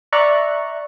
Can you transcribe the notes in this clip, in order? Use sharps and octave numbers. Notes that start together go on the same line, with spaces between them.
D5 E5 A#5 C#6 F#6